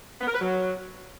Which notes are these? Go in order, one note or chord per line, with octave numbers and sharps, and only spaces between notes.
B3
A#4
B4
F#3